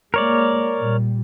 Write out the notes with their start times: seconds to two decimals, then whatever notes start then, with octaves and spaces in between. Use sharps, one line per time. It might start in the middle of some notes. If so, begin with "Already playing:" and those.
0.14 G#3 A#3 A#4 C#5 D5
0.78 A#2 G3